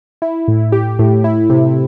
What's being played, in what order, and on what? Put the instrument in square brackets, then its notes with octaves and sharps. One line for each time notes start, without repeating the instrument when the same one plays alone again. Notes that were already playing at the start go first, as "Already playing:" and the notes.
[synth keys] E4
A2
G4
A2
E4
C3